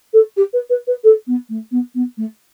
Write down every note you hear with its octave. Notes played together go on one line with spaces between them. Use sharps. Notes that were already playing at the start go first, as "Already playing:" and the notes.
A4
G4
B4
B4
B4
A4
B3
A3
B3
B3
A3